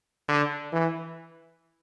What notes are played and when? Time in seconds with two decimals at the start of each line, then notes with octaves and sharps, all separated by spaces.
0.28 D3
0.73 E3